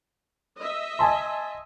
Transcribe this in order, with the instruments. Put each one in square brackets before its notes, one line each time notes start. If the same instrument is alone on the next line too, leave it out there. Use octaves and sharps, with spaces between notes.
[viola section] D#5 E5
[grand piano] G#5 A5 C6